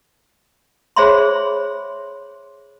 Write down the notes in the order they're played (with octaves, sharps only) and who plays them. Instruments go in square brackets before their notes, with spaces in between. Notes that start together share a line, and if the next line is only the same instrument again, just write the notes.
[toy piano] G#4 C5 C#5 E5 B5 C6